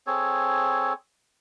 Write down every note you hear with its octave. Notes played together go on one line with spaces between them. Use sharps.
C4 G#4 A4 C#5